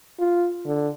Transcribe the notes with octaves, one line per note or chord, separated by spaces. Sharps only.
F4
D3